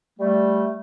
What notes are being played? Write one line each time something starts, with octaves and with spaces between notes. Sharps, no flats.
G3 A3